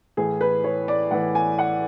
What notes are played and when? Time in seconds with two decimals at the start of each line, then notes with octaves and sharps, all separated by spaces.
0.17 A2 E3 G#4
0.41 B4
0.64 C#5
0.88 D5
1.11 A2 E3 F#5
1.35 G#5
1.58 F#5